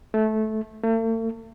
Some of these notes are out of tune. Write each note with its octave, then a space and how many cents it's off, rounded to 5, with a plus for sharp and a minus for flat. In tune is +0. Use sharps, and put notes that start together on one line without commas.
A3 -15
A3 +45